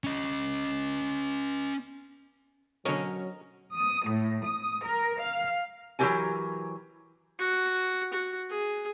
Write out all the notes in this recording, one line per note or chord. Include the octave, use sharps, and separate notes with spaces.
C#4 D#5
B2 D3 F#3 C#4 A#4 D#5
D#6
A2
D#6
A#4
F5
E3 F#3 A#3 G4 A#4 G#5
F#4
F#4
G#4